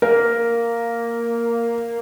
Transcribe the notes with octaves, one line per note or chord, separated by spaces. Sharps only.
A#3 A#4